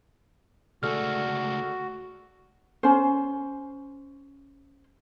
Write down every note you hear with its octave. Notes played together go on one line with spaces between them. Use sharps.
C#2 D3 A3 F#4 G#4 A4 F6
C#4 C5